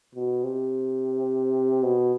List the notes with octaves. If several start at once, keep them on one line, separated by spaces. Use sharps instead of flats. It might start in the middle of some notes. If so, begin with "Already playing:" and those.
B2
C3
B2